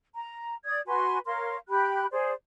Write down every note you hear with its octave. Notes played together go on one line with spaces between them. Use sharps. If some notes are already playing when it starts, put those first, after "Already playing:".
A#5
D5 D#6 G#6
F#4 B4 G#5 C6
A#4 C#5 F5 C6
G4 G5 B5 F#6
G#4 C5 D5